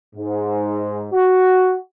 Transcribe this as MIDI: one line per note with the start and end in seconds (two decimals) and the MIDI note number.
0.16 1.07 44
1.13 1.76 66